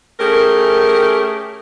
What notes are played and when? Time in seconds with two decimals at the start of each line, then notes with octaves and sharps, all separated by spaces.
0.20 A3 C#4 G4 G#4 A#4